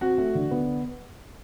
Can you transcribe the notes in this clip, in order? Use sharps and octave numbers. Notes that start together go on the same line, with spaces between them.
C4 F#4
A3
D3
B3